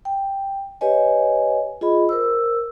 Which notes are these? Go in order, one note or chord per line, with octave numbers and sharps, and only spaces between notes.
G5
G4 B4 C#5 D#5 G#5
F4 G#4 D#5 B5
A#4 C5 E6